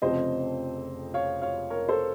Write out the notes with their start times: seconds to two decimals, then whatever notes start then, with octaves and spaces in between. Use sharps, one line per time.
0.02 F1 F2 C#3 F3 C4 C5 D#5
1.14 C#5 F5
1.42 C#5 F5
1.70 A#4 C#5
1.89 A4 C5